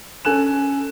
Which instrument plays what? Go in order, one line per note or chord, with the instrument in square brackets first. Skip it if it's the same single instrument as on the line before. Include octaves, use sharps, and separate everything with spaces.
[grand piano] C#4 A4 G#5 F#6 E7